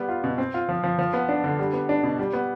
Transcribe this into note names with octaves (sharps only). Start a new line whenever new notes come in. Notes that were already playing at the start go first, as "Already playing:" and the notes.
Already playing: G3 B3
F4
B2
C4
F4
F3
F3
F3
B3
D4
D3
G3
B3
D4
B2
G3
B3